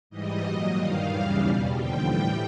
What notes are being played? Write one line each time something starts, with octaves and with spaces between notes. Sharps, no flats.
G#2 E3 G3 D#5
A#2 F#3
G2 D#3 G3 F5
D#2 C#3 E3 G3
E2 B2 G3
D#2 D3 F3 G5
A2 E3 G3